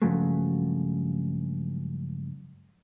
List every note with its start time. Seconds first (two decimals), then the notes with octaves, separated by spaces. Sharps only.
0.02 G2 C#3 F3 F#3 G#3 A3